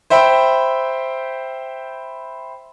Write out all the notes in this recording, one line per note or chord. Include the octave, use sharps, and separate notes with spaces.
C5 E5 G5 B5